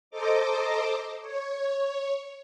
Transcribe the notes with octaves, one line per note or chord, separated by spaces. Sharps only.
A4 C5 D#5 A#5 D6
C#5